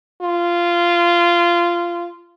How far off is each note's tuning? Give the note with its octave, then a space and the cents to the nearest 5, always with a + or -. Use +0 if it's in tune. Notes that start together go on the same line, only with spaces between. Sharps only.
F4 -15